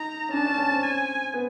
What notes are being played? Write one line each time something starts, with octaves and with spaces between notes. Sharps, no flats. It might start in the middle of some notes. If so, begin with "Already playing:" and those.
Already playing: D#4 A#5
C#4
D4 A5
C#4
C#4
C4
G#5
B3